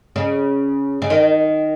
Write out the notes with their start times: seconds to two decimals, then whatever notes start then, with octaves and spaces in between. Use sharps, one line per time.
0.16 C#3
1.02 C#3
1.10 D#3